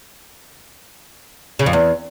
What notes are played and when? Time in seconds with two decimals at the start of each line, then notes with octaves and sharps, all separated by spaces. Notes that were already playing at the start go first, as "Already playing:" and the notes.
1.59 C#3
1.66 F2
1.73 E2